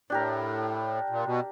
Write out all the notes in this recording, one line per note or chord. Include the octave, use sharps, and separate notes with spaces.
A2 D4 G4 A#4
A#2
B2